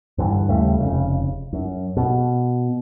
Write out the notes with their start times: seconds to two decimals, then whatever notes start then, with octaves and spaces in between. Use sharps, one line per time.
0.18 G2 D3 E3
0.48 D#2 C#3 G3 A3
0.79 F1 C#3
1.53 F#2
1.97 B2